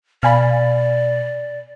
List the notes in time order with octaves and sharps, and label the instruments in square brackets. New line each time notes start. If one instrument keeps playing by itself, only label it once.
[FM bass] B2 [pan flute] D5 [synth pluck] F5 G#5 B5